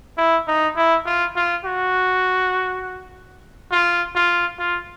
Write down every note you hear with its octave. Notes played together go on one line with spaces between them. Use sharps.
E4
D#4
E4
F4
F4
F#4
F4
F4
F4